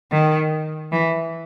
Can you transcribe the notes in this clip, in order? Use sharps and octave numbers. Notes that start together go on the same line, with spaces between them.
D#3
E3